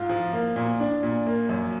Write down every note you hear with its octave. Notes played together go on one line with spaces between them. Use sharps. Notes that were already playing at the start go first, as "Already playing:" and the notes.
Already playing: G#2 F4
F3
A#3
A#2
D4
A#2
A#3
F#2